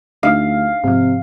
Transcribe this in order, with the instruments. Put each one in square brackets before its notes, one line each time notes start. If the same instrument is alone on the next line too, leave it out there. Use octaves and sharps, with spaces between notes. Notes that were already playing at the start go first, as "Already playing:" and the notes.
[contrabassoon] D2 [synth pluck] D4 D#4 [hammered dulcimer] F5
[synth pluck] G#2 F3 [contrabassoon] C3